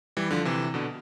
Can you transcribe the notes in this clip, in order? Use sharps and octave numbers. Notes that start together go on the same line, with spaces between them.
E3 G3
D3 F3
C3 E3
B2 D3